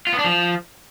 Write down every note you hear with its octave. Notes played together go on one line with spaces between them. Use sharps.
F4
B3
D4
F3